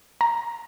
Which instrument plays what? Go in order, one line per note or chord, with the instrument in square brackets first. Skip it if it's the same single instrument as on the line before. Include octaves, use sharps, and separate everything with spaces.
[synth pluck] A#5